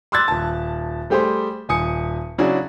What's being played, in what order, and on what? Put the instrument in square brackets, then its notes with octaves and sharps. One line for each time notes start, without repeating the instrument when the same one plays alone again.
[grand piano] C6 D6 E6 F#6 G#6 A6
D#1 A5
G3 A3 G4 G#4 C5
D#1 G#5 D#6 C#7
C#3 F#3 D4 E4 F#4 G#4